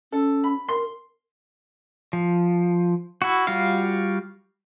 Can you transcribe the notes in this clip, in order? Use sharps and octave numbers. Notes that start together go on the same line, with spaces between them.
C#4 A4
B5
A#4 C6
F3
E4 F#4
G3 F4 F#4 F5